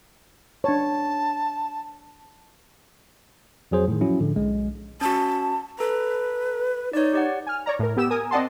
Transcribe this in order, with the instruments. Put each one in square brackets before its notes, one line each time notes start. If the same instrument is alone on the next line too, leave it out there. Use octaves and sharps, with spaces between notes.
[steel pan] D4 C#5 [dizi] A5
[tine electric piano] F2 F#3 G#4 C5
A2 D#3
F3 F#3 C#4 E4 F#4
A2 D3 F3
B1 G#3
[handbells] C#4 F#4 [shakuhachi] A5
[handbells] A4 A#5 [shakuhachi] B4
[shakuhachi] D#4 [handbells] C#5 D5
[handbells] G4 D5 F#5
[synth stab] G#5 F6
C#5 D5 A#5
A2 A#4
B3 G4 E6 E7
A#4 G#5 D#6
C4 D5 D#5 F#5 A5 C6